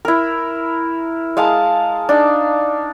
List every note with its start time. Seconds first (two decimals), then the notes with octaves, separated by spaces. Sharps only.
0.05 E4 A#4
1.37 G#3 F5 A5 A#5
2.09 D4 D#4